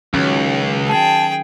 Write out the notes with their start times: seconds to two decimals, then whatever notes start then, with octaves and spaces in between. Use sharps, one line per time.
0.14 C#2 D#3 F#3 C#4
0.88 G#4 G5 A5